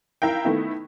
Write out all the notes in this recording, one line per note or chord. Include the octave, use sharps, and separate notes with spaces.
E4 A#4 F5 G5
D#3 A3 B3 E4